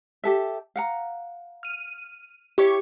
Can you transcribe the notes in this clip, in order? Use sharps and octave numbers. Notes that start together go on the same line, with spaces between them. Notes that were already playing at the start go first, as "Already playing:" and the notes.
G4 A4 E5
F5 F#5 A#5
F6 D#7
E4 G4 C#5 C#6